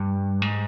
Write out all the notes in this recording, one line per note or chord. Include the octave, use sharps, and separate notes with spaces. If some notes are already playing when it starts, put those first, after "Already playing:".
Already playing: G2
G#2